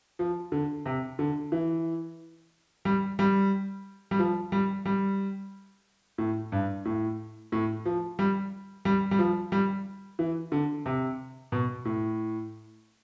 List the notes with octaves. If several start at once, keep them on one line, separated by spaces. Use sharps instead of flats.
F3
D3
C3
D3
E3
G3
G3
G3
F3
G3
G3
A2
G2
A2
A2
F3
G3
G3
G3
F3
G3
E3
D3
C3
B2
A2